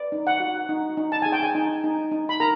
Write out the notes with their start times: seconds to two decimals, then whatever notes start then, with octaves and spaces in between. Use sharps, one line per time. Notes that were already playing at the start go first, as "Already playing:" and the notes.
Already playing: B4 D5
0.12 D#4
0.27 F#5
0.40 F#4
0.69 D#4
0.97 D#4
1.12 A5
1.22 G#4 G#5
1.32 G5
1.42 G#5
1.55 D#4
1.84 D#4
2.11 D#4
2.29 B5
2.40 A#4 A#5